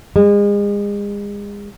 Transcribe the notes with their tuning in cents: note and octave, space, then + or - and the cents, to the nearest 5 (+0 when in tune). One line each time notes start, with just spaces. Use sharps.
G#3 -35